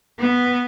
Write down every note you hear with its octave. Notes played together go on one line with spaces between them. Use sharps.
B3